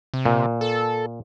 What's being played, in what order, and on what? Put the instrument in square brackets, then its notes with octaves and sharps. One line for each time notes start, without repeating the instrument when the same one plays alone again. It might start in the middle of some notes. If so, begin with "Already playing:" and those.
[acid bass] C3
[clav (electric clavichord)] A#2
[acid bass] A4